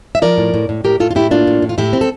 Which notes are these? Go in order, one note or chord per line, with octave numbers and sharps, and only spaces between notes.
E5
F3 A#4 D5
A2
A2
A2
A2 G4 A#4
A2 F4 A4
F4
A2 E4 G4
A#3 D4 F4
A2
A2
F4
A2 E4 G4
C4
A4